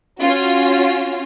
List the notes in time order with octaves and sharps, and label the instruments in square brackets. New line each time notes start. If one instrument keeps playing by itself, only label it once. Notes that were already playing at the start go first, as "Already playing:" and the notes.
[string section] C#4 F4 F#4